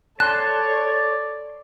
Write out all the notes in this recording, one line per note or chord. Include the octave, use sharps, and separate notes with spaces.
A4 C#5 D5 A5 C6 F#6